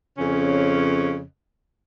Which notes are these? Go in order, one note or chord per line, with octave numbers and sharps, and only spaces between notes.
F2 C#3 C#4